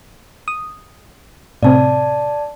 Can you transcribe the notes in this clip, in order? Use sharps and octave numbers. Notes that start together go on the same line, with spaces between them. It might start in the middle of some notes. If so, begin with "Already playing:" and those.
D#6
A2 C3 C4 D5 A5